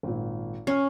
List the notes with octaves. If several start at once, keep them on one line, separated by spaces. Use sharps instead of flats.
G#1 A#2
C#4 F6 C7